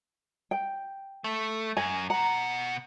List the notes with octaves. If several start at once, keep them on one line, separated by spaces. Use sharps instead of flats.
G5
A3
F#2 G#5
B2 F#5 A#5